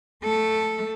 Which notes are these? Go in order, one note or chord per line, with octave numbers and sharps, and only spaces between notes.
A3 A4